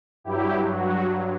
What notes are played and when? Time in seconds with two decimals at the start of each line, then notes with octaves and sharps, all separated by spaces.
0.24 G2 F#3 E4 G4
0.72 F#4